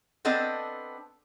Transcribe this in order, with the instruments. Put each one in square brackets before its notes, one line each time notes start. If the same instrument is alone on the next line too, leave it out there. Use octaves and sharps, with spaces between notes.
[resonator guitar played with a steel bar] B3 C4 D4 A4 D#5